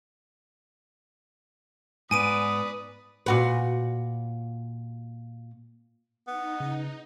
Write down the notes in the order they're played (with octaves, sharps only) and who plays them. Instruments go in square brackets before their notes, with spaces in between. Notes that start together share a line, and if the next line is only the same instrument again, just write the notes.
[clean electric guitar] G#2 B3 [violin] B4 D5 [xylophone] G#5 D7 D#7 [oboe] D#6
[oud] A#2 F#4 B4
[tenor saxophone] B3 [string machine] D#4
[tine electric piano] C#3